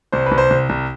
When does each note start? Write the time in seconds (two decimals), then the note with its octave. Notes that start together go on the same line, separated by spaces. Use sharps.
0.12 C2 C5
0.26 C2 B4
0.38 C5
0.50 C2
0.69 C2